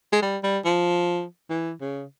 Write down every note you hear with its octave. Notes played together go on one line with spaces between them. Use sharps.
G#3
G3
G3
F3
E3
C#3